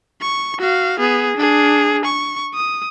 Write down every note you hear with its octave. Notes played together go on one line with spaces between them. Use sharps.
C#6
F#4 F5
B3 G#4
D4 G#4
C#6
D#6